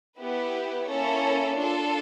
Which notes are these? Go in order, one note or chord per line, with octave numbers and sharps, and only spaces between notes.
B3 E4 G4 B4
A#3 C#4 E4 A4 C#5
D4 F4 A4